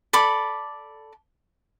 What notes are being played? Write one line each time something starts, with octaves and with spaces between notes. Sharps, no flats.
A4 D5 B5 D6